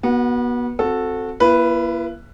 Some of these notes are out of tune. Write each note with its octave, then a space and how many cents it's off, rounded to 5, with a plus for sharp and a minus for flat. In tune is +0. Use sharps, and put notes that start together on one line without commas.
B3 -30 F#4 +10
C4 +0 F#4 -20 A4 +0
A#3 +40 E4 +40 B4 +0